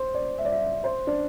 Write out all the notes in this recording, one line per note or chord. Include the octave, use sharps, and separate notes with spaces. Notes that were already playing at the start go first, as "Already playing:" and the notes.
Already playing: C5
D5
E5
D5
E5
C5
D4